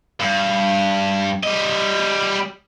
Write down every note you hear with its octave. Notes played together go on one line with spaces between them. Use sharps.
G2
G3 D#5